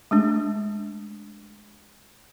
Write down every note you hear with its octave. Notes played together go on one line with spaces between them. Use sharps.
G#3 A3 D4